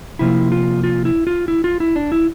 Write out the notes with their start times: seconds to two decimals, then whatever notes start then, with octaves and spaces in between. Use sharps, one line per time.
0.19 C3 F3 A#3 E4
0.52 F4
0.84 F4
1.05 E4
1.27 F4
1.48 E4
1.64 F4
1.80 E4
1.96 D4
2.12 E4